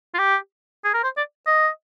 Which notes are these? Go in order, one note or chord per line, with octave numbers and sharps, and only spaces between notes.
F4
G4
G#4
A#4
C5
D5
D#5